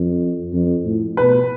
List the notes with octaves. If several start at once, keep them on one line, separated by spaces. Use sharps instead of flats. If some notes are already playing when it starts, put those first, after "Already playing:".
Already playing: F2
F2
A2
B2 B4